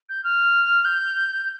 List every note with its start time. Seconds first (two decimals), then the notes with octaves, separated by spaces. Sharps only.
0.09 G6
0.24 F6
0.85 G6